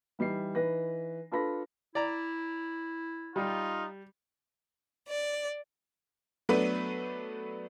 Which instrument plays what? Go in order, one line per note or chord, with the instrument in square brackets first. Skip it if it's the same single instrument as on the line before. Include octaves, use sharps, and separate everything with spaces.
[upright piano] E3 G3 D#4 C7
E3 D#4 B4 A#6
D4 F4 A4 B4 B5 A#6
[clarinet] E4 [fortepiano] D5 A#5
[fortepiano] G3 [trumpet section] D#4 F4
[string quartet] D5
[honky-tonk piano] F#3 A3 B3 D4 B4